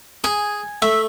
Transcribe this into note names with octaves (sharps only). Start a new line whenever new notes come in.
G#4 G#5
A3 E5